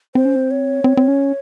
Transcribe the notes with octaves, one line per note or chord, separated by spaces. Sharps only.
C4 C5
C#4
C4
C#5
C4
C4
C#4